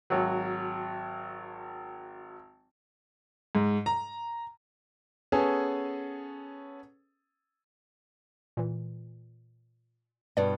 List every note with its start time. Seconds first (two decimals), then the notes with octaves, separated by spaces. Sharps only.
0.10 G#1 F#3
3.55 G#2
3.86 A#5
5.32 B3 C#4 G#4 A4
8.57 A#2 E3
10.37 G2 B2 D5